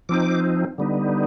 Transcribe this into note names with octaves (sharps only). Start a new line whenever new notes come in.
F3 C4 D#4 D6
D3 G3 B3 D#4